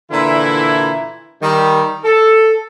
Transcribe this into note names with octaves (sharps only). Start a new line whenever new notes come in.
A#2 D3 E3 E4
D#3 G3
A4